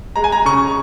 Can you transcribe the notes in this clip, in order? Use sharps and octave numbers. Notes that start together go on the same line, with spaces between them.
G#3 A#5
G#5
A#5
C#3 C#6